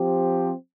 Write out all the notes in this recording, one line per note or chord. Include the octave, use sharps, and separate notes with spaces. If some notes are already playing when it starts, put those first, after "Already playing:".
Already playing: F3 C4 G4